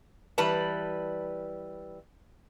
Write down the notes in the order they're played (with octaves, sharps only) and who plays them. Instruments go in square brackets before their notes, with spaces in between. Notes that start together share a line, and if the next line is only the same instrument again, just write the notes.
[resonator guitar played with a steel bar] E3 G3 B4 A5